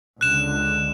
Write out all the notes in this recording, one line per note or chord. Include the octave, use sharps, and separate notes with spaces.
C#2 D3 F#6 E7